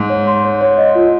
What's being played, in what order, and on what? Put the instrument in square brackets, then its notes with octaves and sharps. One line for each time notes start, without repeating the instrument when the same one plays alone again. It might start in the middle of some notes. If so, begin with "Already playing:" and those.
Already playing: [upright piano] G#2
[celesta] C#5
C6
C#5
C#5
D#5
F4